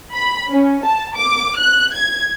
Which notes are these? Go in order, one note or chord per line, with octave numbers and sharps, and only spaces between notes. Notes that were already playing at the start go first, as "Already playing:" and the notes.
B5
C#4
A5
D6
F#6
G#6